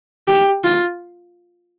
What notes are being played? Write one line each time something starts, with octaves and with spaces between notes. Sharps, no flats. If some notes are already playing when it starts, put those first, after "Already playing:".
G4
F4